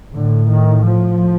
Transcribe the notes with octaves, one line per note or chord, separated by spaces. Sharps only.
A2 D3
D#3
F3